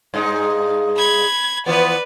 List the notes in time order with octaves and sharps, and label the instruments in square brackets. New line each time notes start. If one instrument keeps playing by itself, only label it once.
[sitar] G2 G#3 D#4
[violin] B5 G#6
[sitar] E3 F3 B3 [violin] B4 D5